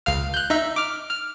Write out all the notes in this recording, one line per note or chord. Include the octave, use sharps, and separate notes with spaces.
C#2 F5 F6
F#6 G6
D#4 E5
D6 F6
F6